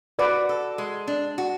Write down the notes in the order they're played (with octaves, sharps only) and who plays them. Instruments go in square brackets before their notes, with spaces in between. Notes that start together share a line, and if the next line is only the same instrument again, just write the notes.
[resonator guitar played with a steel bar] F#4 [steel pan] B4 D5
[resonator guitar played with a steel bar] A4
G#3
D4
F#4